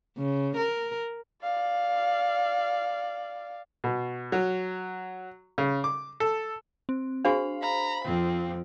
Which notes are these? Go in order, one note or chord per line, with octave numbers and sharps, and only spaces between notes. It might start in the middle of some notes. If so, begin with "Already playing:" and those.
C#3
A#4
D5 F5
B2
F#3
C#3
D6
A4
C4
D4 F#4 G#4 C5 F5
A#5 B5
F2 C4